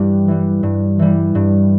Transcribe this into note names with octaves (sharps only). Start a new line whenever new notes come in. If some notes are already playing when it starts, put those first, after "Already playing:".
Already playing: G2 E3 G3 G4 B4
E3 G3
G2
E3 G3
G2